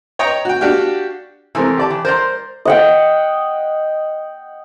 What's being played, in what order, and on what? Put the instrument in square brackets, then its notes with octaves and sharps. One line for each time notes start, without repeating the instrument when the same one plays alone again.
[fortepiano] C#5 D#5 G5 A#5 C#6
F#4 G5
D4 F#4 G4 F5 G5
[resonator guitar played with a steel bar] C3 G#3 A3 [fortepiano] E3 C4 A#4
[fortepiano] G4 D5 A5
[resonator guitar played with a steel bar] E3
[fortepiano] A#4 C6 [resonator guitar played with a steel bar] C5 D5 A#5
[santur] D#5 F#5 G5